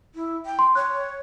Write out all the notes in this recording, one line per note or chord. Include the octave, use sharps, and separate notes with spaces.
E4
G5
C6
C#5 F#6